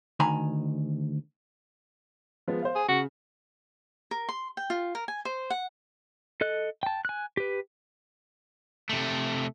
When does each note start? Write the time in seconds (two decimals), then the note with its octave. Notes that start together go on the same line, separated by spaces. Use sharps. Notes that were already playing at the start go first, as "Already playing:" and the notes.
0.20 D2 D#3 G#5 A#5 B5
2.48 F3 G#3 B3
2.62 C5 F5
2.75 G#4
2.88 C#3 F#4
4.11 A#4
4.29 C6
4.57 G5
4.70 F4
4.95 A#4
5.08 G#5
5.25 C5
5.50 F#5
6.41 A4 D#5 F#6
6.83 G5 A5
7.05 G#5 F#6
7.37 G4 B4
8.89 C3 A3